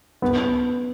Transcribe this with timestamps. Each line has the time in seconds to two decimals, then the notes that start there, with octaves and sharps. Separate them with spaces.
0.22 B3